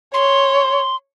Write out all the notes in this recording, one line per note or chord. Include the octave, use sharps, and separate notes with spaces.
C#5 C6